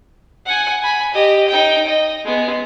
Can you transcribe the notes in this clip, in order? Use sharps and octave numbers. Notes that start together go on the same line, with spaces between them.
F#5 G#5
G#5 B5
G4 D#5
D#4 G5
D#5
G#3 B3